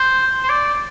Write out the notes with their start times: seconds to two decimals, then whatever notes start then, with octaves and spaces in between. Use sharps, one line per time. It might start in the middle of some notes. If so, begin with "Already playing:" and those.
Already playing: C5
0.43 C5
0.49 D5